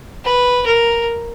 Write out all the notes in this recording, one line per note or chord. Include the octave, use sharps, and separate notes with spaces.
B4
A#4